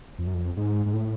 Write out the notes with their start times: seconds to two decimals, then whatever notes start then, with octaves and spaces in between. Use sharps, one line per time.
0.18 F2
0.27 F#2
0.34 F2
0.57 G#2
0.86 G#2
0.94 A2